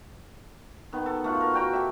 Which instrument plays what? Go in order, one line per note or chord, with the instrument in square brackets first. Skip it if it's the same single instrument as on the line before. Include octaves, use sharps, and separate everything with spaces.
[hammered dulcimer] D#3 B3
A4
A3 F4 F#5
A#4
F#4 G5 A#5
G4 A4 E5